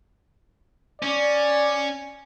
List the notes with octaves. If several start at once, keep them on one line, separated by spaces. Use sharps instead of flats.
C#4 D5